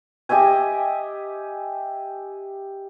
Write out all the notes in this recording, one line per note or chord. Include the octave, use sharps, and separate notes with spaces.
G4 D#5 E5 G#5